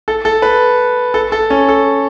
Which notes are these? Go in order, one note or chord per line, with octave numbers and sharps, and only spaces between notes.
A4
A4
B4
A4
A4
C#4
A4